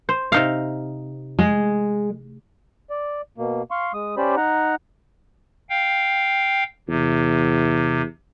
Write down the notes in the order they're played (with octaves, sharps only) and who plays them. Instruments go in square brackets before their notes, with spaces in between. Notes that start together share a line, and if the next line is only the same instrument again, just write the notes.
[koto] C5
C3 D#4 F5
[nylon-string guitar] G#3
[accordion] D5
B2 A#3
F5 C6 C#6
G#3 D#6
C#4 G4 C5 D5 B5
D#4 F#5 A#5
[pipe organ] F5 G5
[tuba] E2 [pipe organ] C3